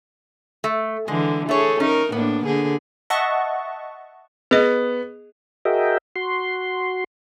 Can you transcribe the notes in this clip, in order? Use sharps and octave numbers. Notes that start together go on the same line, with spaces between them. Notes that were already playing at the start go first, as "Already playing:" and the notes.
A3
D3 E3 G#3
A3 G#4 A4 C#5
C#4 D#4 A#4
A2 A#3 B3 D4
D3 G#4
D#5 E5 F#5 A5 C#6
B3 G#4 D#5
F#4 G#4 A#4 D#5 E5 G5
F#4 C6